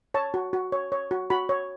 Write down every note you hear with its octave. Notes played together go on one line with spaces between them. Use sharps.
C#5 A5
F#4
F#4
C#5
C#5
F#4
F#4 B5
C#5